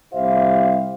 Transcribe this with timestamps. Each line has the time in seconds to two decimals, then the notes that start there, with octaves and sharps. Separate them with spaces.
0.13 C2 E4 G4 C5 E5 F5